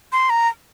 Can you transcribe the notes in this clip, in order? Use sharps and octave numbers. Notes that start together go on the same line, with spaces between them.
C6
A#5